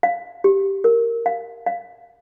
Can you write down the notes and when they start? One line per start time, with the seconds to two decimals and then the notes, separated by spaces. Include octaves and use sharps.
0.03 F5
0.44 G4
0.84 A#4
1.26 F5
1.67 F5